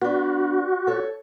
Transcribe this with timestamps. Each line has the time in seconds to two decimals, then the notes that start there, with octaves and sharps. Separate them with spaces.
0.02 B3 D4 F#4
0.87 A4 C#5